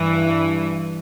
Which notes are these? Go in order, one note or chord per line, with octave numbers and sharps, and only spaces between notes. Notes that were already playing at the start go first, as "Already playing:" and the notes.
Already playing: G2 E3